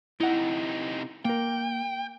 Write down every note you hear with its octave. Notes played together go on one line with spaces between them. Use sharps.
C3 D#4 E4 F#5
A#3 A#4 G5